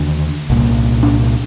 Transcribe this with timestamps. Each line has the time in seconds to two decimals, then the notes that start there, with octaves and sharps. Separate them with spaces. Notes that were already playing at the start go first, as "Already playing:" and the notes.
Already playing: D#2 D3
0.50 C2 A#2
1.03 D4